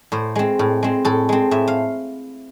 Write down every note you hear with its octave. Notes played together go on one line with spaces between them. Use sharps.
A2 C5
G#3 C4
A2
G#3 C4
A2 A4
G#3 C4
A2 E5
F5